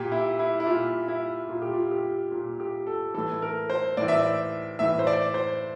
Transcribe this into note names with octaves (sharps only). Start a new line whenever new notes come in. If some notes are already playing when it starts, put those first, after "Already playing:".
Already playing: A#2 G4
E4
E4
E4
A#2 F4
E4
A#2 F4
G4
F4
G4
A#2 F4
G4
A4
A2 E3 A4
A#4
C5
A2 E3 D5
E5
D5
A2 E3 E5
C5
D5
C5